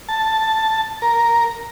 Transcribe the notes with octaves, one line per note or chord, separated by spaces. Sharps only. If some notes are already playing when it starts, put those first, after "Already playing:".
A5
A#4